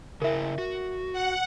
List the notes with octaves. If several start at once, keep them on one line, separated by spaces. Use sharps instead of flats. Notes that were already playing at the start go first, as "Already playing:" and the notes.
C#3 E4 A#4 E5
F#4
F#5